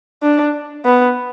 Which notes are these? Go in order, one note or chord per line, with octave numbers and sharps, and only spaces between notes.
D4
B3